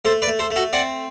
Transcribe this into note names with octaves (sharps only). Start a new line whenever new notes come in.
A3 A4 C5
B4 D5
A3
A4 C5
A3
F#4 A4
C4 D5 F#5